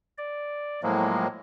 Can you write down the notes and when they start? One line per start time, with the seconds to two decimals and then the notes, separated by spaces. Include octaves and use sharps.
0.18 D5
0.83 A2 F3 F#3 G#3 A#3